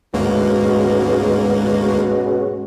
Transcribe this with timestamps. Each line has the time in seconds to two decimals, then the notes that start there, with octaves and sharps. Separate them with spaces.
0.14 D2 G#2 B2 G#3 A#3 C#4 F#4